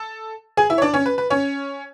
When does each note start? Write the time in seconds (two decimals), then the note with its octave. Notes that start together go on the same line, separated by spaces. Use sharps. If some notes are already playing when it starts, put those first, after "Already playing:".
Already playing: A4 A5
0.57 G#4 G#5
0.70 E4 E5
0.78 C#5
0.82 D4 D5
0.94 C#4 C#5
1.06 B4
1.18 B4
1.30 C#4 C#5